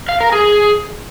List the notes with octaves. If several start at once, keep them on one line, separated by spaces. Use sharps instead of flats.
F5
A#4
G#4